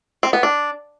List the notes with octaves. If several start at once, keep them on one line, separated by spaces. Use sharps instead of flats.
C4
B3
D4